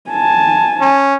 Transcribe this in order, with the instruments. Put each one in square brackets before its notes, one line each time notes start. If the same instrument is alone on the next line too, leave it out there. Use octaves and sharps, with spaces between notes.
[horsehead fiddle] G#5 A5
[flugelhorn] C#4